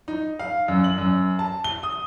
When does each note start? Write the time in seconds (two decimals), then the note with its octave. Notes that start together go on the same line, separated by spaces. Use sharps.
0.08 D#4
0.39 F5
0.68 F#2
0.84 F#7
0.98 F#2
1.39 A5
1.64 G7
1.83 D#6